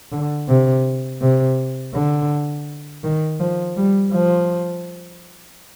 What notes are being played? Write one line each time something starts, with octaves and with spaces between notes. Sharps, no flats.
D3
C3
C3
D3
D#3
F3
G3
F3